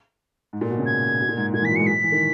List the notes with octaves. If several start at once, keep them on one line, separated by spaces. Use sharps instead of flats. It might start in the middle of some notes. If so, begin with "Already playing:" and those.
G#2
A#2
B2
C#3
G#6
B2
A#2
G#2
A#2 G#6
E3
F#3 B6
G#3 C#7
F#3 B6
E3
D#3